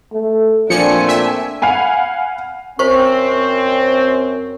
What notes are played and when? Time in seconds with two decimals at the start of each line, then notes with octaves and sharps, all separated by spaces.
0.13 A3
0.70 A#2 F3 A3 C4 D4 G#5 C#7
1.08 E5
1.62 F5 F#5 G#5 B5
2.79 F#2 C4 C5 C#6